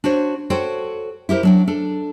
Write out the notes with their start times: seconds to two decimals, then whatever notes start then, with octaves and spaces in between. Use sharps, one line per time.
0.04 D4 F#4 C5 C#5
0.50 F#4 A4 C5 C#5 G5
1.29 E4 G4 A#4 C5
1.43 F#3 D4 G5
1.68 D4 A4